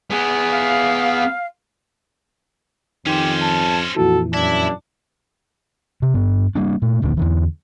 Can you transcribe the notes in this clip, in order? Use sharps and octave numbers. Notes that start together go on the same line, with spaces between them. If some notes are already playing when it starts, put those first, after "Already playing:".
B3 G#4
F5
F2 D#3 C#4 G4 C5
A5
F2 A#2 E3 F#4 A4
F#2 D4 E4 E5
C3
G2 B3
G3 A#3 D4
A#2 A3
E1 D2 A#2 D3
E2 D3 E3